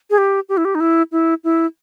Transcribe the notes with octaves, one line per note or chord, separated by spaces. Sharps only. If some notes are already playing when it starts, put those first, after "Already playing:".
G#4
G4
G4
E4
G4
D#4
E4
E4
E4